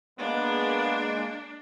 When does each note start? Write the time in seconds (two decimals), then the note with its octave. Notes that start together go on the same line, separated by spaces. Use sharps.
0.19 G#3 A#3 B3 D4